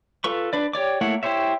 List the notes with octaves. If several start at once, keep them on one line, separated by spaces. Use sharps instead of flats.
F4 A4 B4 C#6
D4 B4 D5
G4 C#5 D5 D6
A3 A#3 E4 C#5 F#5
E4 G4 C5 C#5 E5